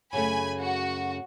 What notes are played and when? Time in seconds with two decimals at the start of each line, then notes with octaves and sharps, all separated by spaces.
0.13 F#2 C#3 A3 G#5 B5
0.60 F#4